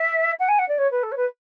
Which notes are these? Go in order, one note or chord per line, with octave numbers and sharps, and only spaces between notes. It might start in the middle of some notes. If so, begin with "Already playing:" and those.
Already playing: E5
F#5
G#5
F#5
D5
C#5
B4
A4
C#5
B4